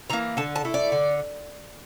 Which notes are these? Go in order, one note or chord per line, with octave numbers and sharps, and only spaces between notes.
E3 A#3 A#5
D3 A5
A5
A3 E4
D5
D3